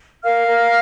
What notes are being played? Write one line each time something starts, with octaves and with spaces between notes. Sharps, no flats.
A#4 F5 F6
A#4